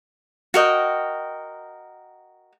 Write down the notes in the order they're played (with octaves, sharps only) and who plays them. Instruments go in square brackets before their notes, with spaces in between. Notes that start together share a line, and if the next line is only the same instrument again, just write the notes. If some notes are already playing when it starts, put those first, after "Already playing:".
[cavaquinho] F#4 A#4 D#5 G5